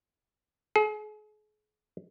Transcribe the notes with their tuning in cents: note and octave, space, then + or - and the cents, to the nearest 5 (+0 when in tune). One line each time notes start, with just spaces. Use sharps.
G#4 +40